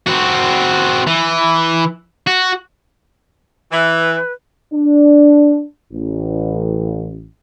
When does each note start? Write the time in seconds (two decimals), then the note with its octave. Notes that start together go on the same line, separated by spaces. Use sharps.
0.06 C4 F#4
1.07 E3
2.27 F#4
3.72 E3 B4
4.73 D4
5.93 A1